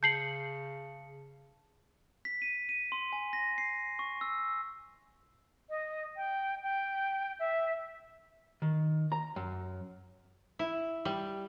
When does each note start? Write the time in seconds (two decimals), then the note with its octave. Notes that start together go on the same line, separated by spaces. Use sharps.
0.03 C#3 A5 G6 C7 C#7 F#7
2.25 B6
2.42 D#7
2.69 D#7
2.92 C6
3.12 G#5
3.33 A#6
3.58 C7
3.99 C#6
4.21 E6
5.70 D#5
6.17 G5
6.63 G5
7.40 E5
8.62 D#3
9.12 A#5
9.36 F#2
10.59 E4
11.05 G3